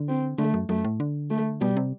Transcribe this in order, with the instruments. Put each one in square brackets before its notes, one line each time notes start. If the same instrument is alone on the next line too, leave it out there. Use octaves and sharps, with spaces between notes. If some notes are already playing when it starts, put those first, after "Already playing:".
Already playing: [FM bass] D3
[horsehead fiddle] C4
[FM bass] D3 [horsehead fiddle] A3
[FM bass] F#2
[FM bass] F#2 [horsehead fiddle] A3
[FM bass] A2
D3
[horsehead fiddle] A3
[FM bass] B2 [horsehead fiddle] G3
[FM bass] C3